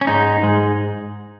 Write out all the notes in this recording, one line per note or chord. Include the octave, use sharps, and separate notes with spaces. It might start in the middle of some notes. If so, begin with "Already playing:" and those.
C#4
G#2 G#3 D#4
G#2 G#3